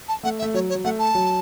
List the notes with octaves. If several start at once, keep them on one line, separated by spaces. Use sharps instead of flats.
A5
A3 F#5
E5
A3
F#3 C#5
C#5
F#3
A3 F#5
A5
F#3